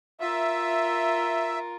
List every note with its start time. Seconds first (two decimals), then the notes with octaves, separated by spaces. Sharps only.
0.20 F4 A#4 E5